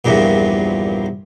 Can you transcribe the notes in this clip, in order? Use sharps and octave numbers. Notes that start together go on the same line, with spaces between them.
A#1 E2 G2 A#2